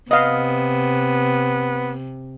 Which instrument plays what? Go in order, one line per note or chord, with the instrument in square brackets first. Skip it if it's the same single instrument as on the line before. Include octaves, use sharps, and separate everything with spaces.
[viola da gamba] C3 [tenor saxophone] B3 [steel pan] D#5 F5